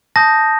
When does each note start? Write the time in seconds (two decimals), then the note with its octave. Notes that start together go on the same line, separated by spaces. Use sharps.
0.16 A5 D#6 G6 A#6